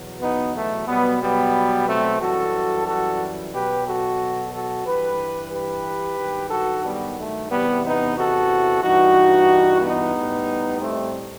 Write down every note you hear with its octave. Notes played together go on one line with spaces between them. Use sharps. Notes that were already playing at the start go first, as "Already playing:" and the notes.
Already playing: E2 B2 F#3
B3 D#4
A3
B2 F#3 G3 B3
G3 B3
A3 C4
F#2 E3 G3 F#4 A4
F#4 A4
B2 F#3 G4 B4
F#4 A4
F#4 A4
G2 E3 G3 G4 B4
G4 B4
G2 D#3 F#3
F#4 A4
G3 B3
A3
E2 C3 E3 G3 B3
B3 D#4
F#4 A4
G2 E3 G3 D#4 F#4
B3 D#4
A2 G3
A3 C4